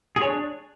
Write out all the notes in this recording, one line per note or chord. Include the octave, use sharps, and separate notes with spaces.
G#4
C#5
D4